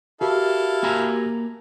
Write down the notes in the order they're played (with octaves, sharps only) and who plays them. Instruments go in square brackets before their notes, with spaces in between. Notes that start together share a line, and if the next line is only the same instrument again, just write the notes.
[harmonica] E4 A4 F5 [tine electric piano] F#4 G4 A#4
[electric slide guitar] A#3 G#5 A#5